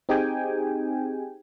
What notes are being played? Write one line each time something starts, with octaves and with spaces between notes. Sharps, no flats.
C4 D#4 G4 G#4 G5 G#5